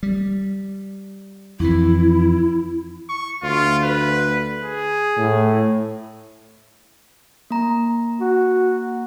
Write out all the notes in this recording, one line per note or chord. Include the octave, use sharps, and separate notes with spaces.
G3
F2 E3 E4
C#6
D2 F4
B4
G#4
A2
A#3 A#5
F#4